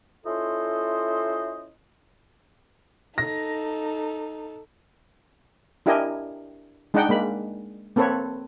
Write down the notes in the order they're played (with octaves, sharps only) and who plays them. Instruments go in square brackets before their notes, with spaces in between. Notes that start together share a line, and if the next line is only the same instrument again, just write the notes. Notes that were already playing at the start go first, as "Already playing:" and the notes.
[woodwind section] C#4 E4 F4 A4 C5 D#5
[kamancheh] D#4 A4 [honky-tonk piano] A#6
[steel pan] D4 E4 G4 A#4 D#5 G#5
G#3 D4 D#4 D#5 F#5 G5
G#3 A#3 B5
A#3 C4 A4 B4 C#5